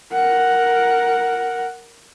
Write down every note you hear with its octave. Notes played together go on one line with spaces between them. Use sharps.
A#4 F#5